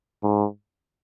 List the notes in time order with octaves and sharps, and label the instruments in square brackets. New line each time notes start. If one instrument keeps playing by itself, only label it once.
[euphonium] G#2